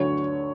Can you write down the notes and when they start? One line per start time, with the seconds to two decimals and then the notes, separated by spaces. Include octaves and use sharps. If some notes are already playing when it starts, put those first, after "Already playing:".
Already playing: D2 D3 F#3 C#5